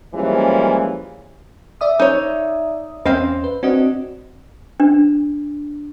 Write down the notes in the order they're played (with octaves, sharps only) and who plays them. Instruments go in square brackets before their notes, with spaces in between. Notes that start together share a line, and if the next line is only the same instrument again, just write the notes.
[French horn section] E3 F3 G3 G#3 A#3 C#4
[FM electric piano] D5 E5 D#6
[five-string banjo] D#4 C#5
[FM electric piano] E2 C#4 [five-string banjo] C4 D#5 F5
[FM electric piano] B4
[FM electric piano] C4 F#4 D#5 [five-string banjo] D4
[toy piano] D4